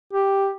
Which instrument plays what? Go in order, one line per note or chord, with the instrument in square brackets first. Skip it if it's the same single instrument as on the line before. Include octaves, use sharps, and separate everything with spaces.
[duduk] G4